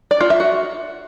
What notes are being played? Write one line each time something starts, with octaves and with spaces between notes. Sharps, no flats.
D5
F4
E5
F#4